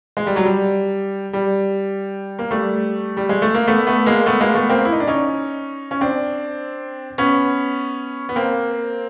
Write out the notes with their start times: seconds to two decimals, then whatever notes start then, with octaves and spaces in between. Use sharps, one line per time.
0.17 G#3
0.27 G3
0.36 F#3
0.45 G3
1.33 G3
2.39 A#3
2.51 G3 A3
3.17 G3
3.29 G#3
3.42 A3
3.55 A#3
3.68 A3 B3
3.87 A3 B3
4.06 G#3 A#3
4.26 A3 B3
4.40 G#3 A#3
4.55 A3 B3
4.70 A#3 C4
4.85 E4
4.92 D#4
5.00 D4
5.07 C#4 D#4
5.91 C#4
6.01 C4 D4
7.18 B3 C#4
8.29 B3
8.36 A#3 C4